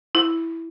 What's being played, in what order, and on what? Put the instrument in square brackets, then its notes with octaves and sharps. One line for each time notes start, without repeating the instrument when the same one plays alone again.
[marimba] E4